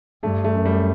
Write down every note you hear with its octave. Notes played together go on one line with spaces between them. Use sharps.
G2 A3
A3
F#2
G3